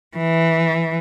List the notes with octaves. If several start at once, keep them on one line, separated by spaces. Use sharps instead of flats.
E3